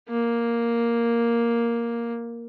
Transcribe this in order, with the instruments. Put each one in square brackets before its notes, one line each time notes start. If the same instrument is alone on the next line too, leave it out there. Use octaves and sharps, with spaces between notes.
[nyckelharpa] A#3